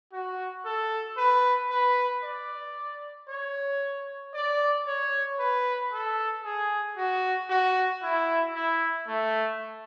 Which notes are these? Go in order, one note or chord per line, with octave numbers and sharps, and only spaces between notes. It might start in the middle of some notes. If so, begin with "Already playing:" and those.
F#4
A4
B4
B4
D5
C#5
D5
C#5
B4
A4
G#4
F#4
F#4
E4
E4
A3